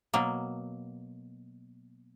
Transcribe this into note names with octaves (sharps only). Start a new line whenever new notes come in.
B2 F#3 A#3